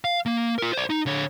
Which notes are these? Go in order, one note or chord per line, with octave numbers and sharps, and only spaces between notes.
F5
A#3
F4 A#4
C5 D5
D#4
D3 C#5